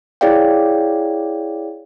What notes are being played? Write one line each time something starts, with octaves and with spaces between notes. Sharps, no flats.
E4 G#4 C#5 D5 F5 G5